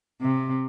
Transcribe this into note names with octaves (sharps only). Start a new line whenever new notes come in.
C3